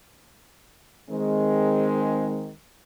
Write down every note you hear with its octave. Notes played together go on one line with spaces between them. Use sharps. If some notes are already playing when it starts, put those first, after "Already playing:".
D#3 G#3 C4